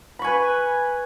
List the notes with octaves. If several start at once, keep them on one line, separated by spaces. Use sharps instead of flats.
B4 G#5 B5 C#6